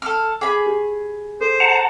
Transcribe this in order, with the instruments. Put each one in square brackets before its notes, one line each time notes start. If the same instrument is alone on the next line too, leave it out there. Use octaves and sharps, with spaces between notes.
[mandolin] A4 F6
[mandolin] G#4 B5 [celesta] D6
[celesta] G4
[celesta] A4 [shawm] C5
[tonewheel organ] F#5 A5 A#5